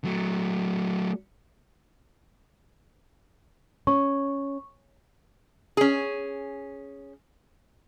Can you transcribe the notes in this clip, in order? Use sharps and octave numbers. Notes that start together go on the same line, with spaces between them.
F#3 A3
C#4 C#6
C#4 G#4